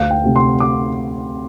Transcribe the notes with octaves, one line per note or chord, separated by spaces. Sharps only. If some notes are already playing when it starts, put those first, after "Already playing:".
Already playing: D2 F5
G5
C3 A3
C6
D6